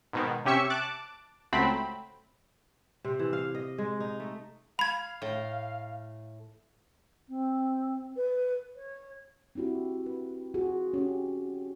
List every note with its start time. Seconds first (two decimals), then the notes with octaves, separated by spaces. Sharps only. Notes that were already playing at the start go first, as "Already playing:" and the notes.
0.13 G#2 B2 D#3
0.45 C3 C#4 G4 E5 C#6 C#7
0.70 A5 D6 F#6
1.53 C#2 F#3 A3 C4 B5
3.04 C3
3.19 E3
3.33 F5
3.55 D#5
3.78 G#3
4.00 D#4
4.20 A3
4.79 F5 B5 G#6
5.22 A2
7.28 C4
8.16 B4
8.76 C#5
9.55 C4 D4 E4 F#4 G4
10.06 B4
10.54 F4 F#4 G#4
10.94 C#4 F#4 G4